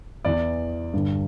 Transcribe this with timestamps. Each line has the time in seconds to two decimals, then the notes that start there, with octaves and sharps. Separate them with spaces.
0.25 E2 E3 D5
0.94 G2 D3